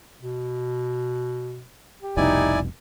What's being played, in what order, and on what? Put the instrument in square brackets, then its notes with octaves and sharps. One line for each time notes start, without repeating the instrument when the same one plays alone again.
[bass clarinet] B2
G4
[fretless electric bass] F1 C2 B2 [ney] D#4 [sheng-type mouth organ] E4 D5 G#5